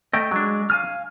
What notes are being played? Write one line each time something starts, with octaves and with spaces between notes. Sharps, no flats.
A3 D#5 G5
F#3 G#3 D4
F5 G#5 F6